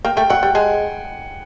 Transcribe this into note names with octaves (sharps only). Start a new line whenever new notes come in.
A#3 G5
A3 G5
F#3 F#5
G3 G5
G#3 G#5